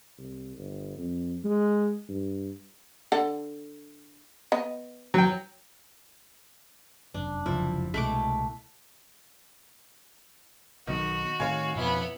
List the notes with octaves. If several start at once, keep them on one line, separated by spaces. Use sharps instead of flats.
C2
G1
F2
G#3
G2
D3 A4 F#5
B3 D#5
F#3 G5
F1 F#2 D4
F1 C#2 F#2 F3 E4
C2 B2 G#3 A3 F#5 D6 B6
B1 D#3 F#3 B3 F#4
A2 D#3 C#5 F5 G#5
F2 B2 F3 B3 E4